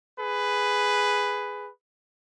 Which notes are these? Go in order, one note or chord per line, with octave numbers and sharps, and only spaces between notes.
G#4 B4